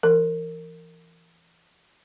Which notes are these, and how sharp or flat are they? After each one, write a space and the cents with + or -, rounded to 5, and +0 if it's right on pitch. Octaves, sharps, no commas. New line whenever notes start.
E3 +30 A#4 -25